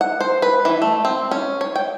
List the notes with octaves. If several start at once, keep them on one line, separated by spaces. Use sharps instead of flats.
F#5
C5
B4
E3
A3
C4
C#4
C#5
G5